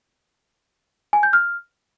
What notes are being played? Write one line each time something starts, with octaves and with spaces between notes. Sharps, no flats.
G#5
G6
F6